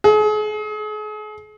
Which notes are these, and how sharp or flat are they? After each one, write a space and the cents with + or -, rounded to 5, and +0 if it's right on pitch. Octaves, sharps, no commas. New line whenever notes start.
G#4 +40